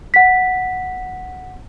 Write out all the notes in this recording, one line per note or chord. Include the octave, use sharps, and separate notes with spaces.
F#5 B6